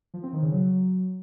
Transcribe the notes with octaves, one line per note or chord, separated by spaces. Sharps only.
F3
C4
D#3
C#3
F#3